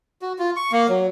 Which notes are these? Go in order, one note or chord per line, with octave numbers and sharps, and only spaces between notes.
F#4
F4
C#6
A#3
F#3